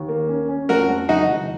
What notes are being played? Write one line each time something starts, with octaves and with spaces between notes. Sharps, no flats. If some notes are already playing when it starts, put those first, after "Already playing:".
Already playing: D#2
A#3
C#4
C#4
F2 F#4 A#4
F2
F#1 D#4 F#4
F#1